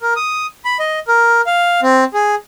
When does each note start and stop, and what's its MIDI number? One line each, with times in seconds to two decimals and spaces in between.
0.01 0.14 70
0.16 0.46 87
0.65 0.78 83
0.79 0.99 75
1.08 1.41 70
1.46 1.80 77
1.82 2.04 60
2.14 2.35 68